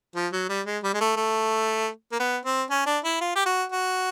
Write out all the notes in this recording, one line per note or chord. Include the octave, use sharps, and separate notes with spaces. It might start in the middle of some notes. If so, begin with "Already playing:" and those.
F3
F#3
G3
G#3
G3
G#3
A3
A3
A#3
B3
C4
C#4
D4
E4
F4
G4
F#4
F#4